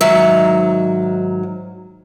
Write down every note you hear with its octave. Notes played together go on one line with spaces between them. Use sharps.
G#2 D#3 F#3 E5